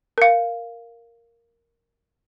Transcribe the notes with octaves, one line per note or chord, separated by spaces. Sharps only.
A#4 F5